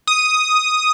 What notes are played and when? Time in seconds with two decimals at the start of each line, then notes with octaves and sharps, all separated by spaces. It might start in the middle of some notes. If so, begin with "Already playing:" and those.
0.07 D#6